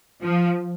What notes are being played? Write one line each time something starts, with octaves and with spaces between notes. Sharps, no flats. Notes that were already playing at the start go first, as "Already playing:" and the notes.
F3